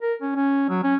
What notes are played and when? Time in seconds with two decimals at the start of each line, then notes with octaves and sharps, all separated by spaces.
0.01 A#4
0.21 C#4
0.36 C#4
0.69 F#3
0.84 C#4